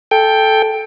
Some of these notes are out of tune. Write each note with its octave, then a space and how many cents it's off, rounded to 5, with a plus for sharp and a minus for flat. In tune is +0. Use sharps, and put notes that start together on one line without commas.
A4 -10 G5 +10